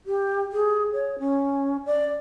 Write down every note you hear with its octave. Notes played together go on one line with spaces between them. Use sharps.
G4
G#4
C#5
C#4
D5